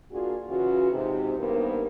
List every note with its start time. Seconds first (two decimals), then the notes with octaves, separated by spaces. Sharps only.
0.11 A#3 D4 F4 F#4 G#4
0.47 C#3 E3 F4 F#4
0.92 G#2 C3
1.38 G2 D#3 A#3 B3 C5